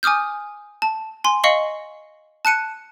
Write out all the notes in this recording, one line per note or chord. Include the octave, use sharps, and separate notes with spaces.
G#5 D6 D#6 F6 G6
A5
G#5 C6
D#5 F5 C#6 C#7 F#7 G7
A5 F#6 C#7 D#7